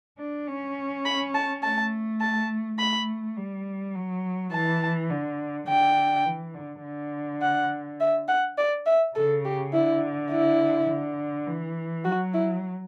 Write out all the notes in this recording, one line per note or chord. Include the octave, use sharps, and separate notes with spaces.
D4
C#4
B5
A5
A3 A5
A5
A3 B5
G3
F#3
E3 A5
D3
D3 G5
E3
D3
D3
F#5
E5
F#5
D5
E5
C#3 A4
G4
D3 E4
E4
D3
E3
F#3 F#4
E4